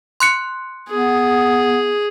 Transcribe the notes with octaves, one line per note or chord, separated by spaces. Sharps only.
C6 F#6 C#7
B3 G#4